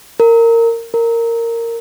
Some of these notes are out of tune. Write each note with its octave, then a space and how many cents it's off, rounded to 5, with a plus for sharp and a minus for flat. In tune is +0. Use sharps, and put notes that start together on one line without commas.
A#4 -20
A#4 -15